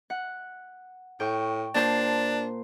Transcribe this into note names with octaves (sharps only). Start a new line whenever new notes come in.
F#5
A2 G5 C#6
A#2 D4 C5 A5